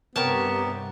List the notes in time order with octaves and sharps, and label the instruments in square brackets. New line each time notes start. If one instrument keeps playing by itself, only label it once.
[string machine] G2 C3 [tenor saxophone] B3 [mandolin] G4 A#4 C#5 [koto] A5